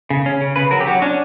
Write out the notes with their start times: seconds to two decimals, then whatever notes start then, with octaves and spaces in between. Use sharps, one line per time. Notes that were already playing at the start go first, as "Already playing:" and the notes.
0.10 C#3
0.26 C#4
0.41 C#3
0.56 C#3 B4
0.71 F#3 A#4
0.80 G4
0.87 F#3 F#4
1.02 C#4 D4